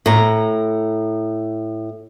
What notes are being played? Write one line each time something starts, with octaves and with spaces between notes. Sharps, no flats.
A2 A#5